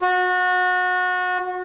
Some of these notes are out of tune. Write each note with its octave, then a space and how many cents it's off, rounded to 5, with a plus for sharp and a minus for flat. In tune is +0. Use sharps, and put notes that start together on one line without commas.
F#4 -25